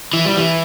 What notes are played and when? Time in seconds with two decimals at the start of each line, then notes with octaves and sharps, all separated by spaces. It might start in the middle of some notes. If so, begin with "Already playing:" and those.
0.13 E3
0.25 G3
0.37 E3